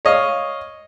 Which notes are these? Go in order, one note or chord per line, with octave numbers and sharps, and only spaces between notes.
C#5 D#5 F5